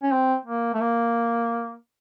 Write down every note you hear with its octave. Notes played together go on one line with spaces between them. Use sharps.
C#4
C4
A#3
A3
A#3